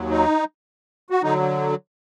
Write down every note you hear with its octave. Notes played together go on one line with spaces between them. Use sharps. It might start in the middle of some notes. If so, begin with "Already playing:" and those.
Already playing: D#2 F#3
D#4
F#4
D3 F#3 D#4